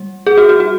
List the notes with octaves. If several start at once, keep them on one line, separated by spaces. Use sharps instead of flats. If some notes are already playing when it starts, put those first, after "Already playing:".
Already playing: G3
G#4
F#4
F#4
F#4